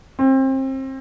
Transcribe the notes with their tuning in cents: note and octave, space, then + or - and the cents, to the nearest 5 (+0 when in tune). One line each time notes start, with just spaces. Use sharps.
C4 +30